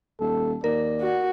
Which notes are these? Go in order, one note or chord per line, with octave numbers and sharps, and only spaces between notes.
D#1 A4
D#2 A#4 D5
F#4